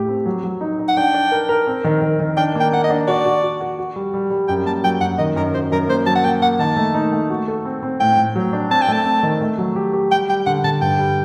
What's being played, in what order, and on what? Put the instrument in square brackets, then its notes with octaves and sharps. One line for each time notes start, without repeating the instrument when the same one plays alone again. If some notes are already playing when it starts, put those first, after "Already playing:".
Already playing: [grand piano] A2 A3 G4
C4
F#3
F#3
D#4
D#4
[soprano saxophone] F#5
[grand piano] D4 [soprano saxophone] G5
[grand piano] D4
A#4
A#4
C4
D#3
D#3
D#3
[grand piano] D4 [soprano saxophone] G5
[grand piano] A#3 [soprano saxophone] G5
[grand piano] A#3 [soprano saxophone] F#5
[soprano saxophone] D#5
[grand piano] D4
[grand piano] F#4 [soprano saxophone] D5
[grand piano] F#4
F#4
F#4
F#4
G3
G3
G3
[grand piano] F#2 [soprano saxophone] G5
[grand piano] A#3 [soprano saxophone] A5
[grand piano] F#3 [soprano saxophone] G5
[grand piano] F#2 [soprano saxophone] F#5
[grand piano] D#3 [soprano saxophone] D#5
[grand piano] F#2 [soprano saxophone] A#4
[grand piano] F#2 [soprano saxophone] C5
[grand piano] F#2 [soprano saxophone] A#4
[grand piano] A#3 [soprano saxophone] C5
[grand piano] F#3 [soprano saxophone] A5
[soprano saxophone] F#5
[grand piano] A#3 [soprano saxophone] G5
[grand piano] A#3 [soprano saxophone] F#5
[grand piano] D#3 [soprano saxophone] A5
[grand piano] A3
D#4
A3
F#4
A4
C4
C4
[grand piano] A2 [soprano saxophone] G5
[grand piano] A2
F#3
D4
[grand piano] C4 [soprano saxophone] A5
[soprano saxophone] G5
[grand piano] A3 [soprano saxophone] A5
[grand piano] C4
D#3
A3
F#3
G4
G4
[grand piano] G3 [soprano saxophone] G5
[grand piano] G3 [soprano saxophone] G5
[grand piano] D3 [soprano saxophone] F#5
[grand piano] D3 [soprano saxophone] A5
[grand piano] G2 [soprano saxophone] G5
[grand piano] G3